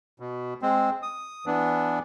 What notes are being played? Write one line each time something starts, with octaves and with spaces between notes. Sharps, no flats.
B2
G#3 C4
D#6
E3 B3 D4